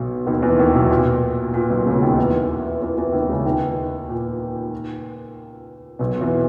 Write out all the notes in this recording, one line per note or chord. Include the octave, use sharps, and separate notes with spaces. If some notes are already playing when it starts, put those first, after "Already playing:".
Already playing: B1 B2
D#2 D#3
E2 E3
D#2 D#3
B1 B2
A#2
A#2
B1 B2
C#2 C#3
D#2 D#3
E2 E3
E2 E3
E2 E3
D#2 D#3
C#2 C#3
D#2 D#3
A#2
B1 B2
E2 E3